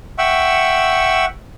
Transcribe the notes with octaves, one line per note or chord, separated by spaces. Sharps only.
E5 F#5 G5 C#6 E6